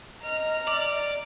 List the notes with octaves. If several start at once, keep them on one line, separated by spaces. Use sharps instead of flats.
D#5 A#5 F6
D5